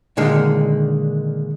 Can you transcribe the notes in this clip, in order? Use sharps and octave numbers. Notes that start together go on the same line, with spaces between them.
A#2 D3 D#3 G#3